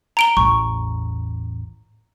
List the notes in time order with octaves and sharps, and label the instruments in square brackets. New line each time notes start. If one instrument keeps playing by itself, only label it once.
[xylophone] A#5 D7 G7
[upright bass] A1 E2 [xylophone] C#6